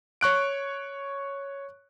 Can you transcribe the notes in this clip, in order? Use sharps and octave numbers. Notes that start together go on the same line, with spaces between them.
C#5 C#6 F#6 D7